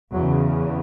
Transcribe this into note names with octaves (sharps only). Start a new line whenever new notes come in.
E2 C#3 F#3